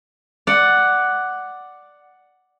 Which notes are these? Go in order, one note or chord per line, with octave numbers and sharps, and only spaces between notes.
D5 F#5